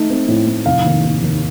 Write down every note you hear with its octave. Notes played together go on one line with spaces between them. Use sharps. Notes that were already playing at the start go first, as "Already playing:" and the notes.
Already playing: A3 D#4
C4
A2
A2
F1 F5
D#2
D#2
D#2